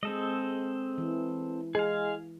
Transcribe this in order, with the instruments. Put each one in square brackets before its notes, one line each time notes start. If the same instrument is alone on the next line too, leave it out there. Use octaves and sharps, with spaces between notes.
[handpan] G#3 [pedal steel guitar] C4 A4 D#5
[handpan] E3
[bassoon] G#3 [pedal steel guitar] G#4 F5